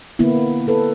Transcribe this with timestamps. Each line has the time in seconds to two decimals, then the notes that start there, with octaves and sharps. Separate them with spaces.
0.19 D3 A#3 B3 E4
0.67 E4 A4 B4